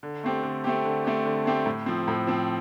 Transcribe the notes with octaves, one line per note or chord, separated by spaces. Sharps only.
D3
A3 C4 G4
D3
A3 C4 G4
D3
A3 C4 G4
D3
A3 C4 G4
A2
F3 C4
A2
F3 C4